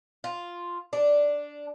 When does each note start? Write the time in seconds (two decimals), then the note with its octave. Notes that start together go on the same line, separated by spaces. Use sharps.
0.24 F4
0.93 D4